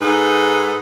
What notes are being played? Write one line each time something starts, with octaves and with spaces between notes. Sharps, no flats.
G#2 D#4 A4 B4 F#5